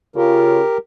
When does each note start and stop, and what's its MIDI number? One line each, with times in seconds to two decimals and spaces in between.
0.16 0.60 49
0.16 0.60 65
0.16 0.78 67
0.16 0.78 70